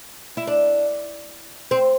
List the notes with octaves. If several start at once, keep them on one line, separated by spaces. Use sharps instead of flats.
E4
D4
C4